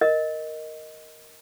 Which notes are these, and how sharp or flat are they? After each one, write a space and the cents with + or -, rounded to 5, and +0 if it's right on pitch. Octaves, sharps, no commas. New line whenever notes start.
A#4 +0 D#5 +0